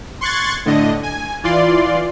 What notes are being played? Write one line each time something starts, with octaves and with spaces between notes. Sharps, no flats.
C6 C#6 F#6 G#6 A6
A2 D3 D#5
G#5
E3 F4 D5 C6